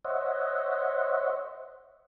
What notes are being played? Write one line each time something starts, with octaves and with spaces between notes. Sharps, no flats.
C5 C#5 D#5 E5 F#5